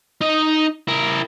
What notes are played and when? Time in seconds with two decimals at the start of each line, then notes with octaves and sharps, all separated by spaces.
0.21 D#4 D#5
0.88 E4 A#4